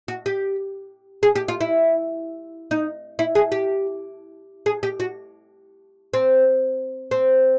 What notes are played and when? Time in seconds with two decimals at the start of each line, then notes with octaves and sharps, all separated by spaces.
0.08 F#4
0.26 G4
1.23 G#4
1.36 G4
1.48 F4
1.61 E4
2.71 D#4
3.19 E4
3.35 G#4
3.52 G4
4.66 G#4
4.83 G4
5.00 F#4
6.14 C4
7.11 C4